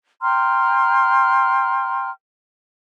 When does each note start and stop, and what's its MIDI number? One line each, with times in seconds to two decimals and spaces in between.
0.21 2.09 79
0.21 2.09 82
0.21 2.09 84
0.21 2.09 89